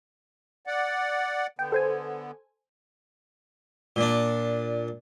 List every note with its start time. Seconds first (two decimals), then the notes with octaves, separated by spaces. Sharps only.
0.67 D5 F#5
1.59 D3 B3 G5
1.72 A4 C5 G#5
3.96 A#2 D4